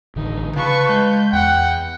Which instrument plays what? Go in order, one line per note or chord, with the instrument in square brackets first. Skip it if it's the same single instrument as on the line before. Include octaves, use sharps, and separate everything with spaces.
[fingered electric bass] A1 D3 D#3 [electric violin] D#4
[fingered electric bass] C#3 [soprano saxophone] F4 [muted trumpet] B4 [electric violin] A5 C#6
[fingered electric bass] G#3 [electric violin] G6
[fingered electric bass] E2 [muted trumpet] F#5 [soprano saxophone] G5